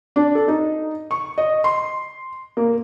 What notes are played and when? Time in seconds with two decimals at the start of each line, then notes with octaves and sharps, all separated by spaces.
0.16 D4
0.35 A4
0.48 D#4
1.11 C#6
1.38 D#5
1.64 C6
2.57 A#3